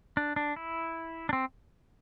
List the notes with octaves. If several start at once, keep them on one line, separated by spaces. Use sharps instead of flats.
D4
D4
E4
D4
C4